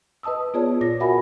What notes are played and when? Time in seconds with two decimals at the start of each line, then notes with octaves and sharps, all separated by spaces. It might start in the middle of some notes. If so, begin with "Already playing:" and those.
0.23 B4 D#5 A5 D#6 E6
0.54 B3 F4 G#4 C#5 D5 A5
0.81 A#2 F4 A#6
1.00 F#4 A#4 E5 F#5 G#5 B5